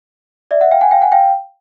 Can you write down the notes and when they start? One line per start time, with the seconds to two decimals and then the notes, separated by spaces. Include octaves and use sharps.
0.51 D5 E5
0.61 E5 F#5
0.71 F5 G5
0.81 F#5 G#5
0.91 F5 G5
1.02 F#5 G#5
1.12 F5 G5